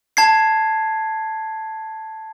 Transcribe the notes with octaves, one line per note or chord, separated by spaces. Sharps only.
A5 G#6 C7